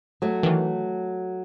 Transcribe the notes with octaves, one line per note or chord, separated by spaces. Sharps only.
F#3 A3
D#3 E3